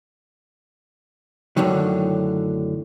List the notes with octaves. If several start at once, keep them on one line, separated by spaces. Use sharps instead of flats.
F#2 A2 D3 D#3 F#3